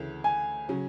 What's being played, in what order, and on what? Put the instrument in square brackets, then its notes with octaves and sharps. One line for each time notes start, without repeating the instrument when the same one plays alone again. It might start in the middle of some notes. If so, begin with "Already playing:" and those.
Already playing: [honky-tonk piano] D2 C#3 E3
[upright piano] G#5
[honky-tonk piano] C#3 F#3 C#4